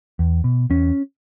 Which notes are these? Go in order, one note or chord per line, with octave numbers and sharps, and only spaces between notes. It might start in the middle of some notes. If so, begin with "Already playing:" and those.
E2
B2
E2 C#4